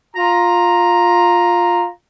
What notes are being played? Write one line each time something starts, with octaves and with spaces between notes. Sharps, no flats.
F4 A#5